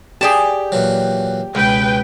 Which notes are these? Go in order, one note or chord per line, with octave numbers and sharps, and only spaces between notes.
G4 G#4 D5 A5
A#2 E3 F#3
C#2 B2 B4 G5